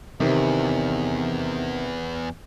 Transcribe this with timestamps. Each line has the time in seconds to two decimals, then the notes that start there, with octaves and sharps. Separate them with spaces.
0.20 E2 C3 D#3